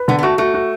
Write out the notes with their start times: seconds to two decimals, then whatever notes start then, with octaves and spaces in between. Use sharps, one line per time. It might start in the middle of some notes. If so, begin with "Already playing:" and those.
Already playing: B4
0.08 D3 B3
0.19 B3
0.23 A3 F#4
0.38 A3 F#4
0.54 F#4